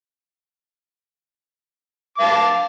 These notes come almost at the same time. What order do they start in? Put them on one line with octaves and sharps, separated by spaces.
D6 F5 A5